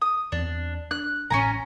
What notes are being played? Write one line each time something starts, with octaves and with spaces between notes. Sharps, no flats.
D#6
E2 C4 D4
D4 F#6
D#1 A1 A2 C#4 G#5 A#5